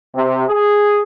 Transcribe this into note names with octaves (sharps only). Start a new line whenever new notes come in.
C3
G#4